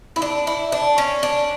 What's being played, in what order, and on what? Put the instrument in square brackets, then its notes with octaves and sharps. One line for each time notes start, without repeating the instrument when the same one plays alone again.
[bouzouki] E4
D4
E4
D4
C#4
D4